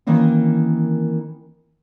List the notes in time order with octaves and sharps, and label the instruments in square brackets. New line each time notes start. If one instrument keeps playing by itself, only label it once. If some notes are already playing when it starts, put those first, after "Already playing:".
[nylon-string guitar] D#3 E3 A#3 C4 C#4